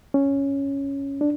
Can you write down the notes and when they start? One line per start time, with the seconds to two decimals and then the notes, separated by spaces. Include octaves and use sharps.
0.14 C#4
1.21 D4